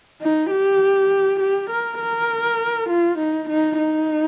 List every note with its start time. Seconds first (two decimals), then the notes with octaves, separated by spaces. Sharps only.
0.21 D#4
0.51 G4
1.40 G4
1.70 A#4
2.00 A#4
2.89 F4
3.18 D#4
3.49 D#4
3.78 D#4